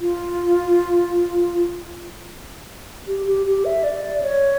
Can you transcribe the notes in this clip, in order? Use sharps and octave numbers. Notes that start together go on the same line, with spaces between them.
F4
G4
G4
G4
E5
D5
C#5